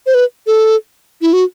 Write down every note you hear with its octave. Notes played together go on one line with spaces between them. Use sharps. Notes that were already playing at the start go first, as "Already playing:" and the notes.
C5
B4
A4
E4
F#4